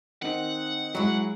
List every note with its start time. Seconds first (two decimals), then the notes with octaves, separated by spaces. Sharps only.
0.22 D#3 C4 D#4 F#5
0.95 F#3 G#3 E4 D5 A#5